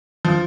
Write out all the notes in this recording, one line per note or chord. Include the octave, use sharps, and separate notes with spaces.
F3